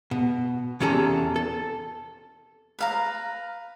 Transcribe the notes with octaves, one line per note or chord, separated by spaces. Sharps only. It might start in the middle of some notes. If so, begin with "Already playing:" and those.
B2
E2 C3 C#4 G#4 A4 A#5
A4
B4 F5 A#5